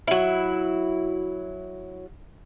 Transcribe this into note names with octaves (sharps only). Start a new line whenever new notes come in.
F#3 E4